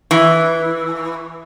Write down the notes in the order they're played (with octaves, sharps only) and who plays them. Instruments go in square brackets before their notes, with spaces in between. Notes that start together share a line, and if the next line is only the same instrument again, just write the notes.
[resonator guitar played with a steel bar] E3